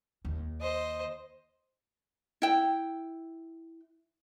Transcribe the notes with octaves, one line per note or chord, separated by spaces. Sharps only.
D#2
C5 D#5
E4 G5